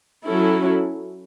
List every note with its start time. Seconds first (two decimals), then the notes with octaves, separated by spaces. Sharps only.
0.24 F#3 C#4 E4 A4